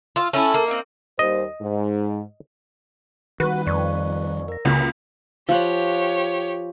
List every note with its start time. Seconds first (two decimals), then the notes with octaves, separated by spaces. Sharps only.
0.16 F4 F5 E6
0.33 A3 C#4 E4 A4
0.54 A#3
0.67 C4 D#4
1.19 D#2 G3 C5 D#5
1.61 G#2
3.40 D#3 G3 F#4 B4
3.67 F2 D5 C#6
4.48 A#4 A#6
4.65 C#2 C#3 A#3 F#4 B6
5.49 F3 F4 G4 C#5 F#5